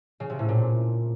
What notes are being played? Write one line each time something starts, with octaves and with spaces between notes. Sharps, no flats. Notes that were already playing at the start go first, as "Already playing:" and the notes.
C#3
C3
A2
A#2